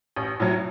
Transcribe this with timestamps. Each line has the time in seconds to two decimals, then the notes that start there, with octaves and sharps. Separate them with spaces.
0.16 A1
0.40 A2 F#3